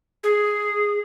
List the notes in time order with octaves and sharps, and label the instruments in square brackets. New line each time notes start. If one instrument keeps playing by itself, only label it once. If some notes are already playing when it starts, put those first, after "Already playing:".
[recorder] G#4